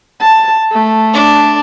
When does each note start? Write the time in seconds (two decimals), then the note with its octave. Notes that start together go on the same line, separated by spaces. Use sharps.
0.21 A5
0.72 A3
1.14 D4